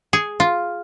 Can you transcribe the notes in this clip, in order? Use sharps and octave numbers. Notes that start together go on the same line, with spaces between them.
G#4
F4